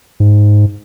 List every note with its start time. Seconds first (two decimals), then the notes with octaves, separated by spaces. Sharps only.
0.20 G#2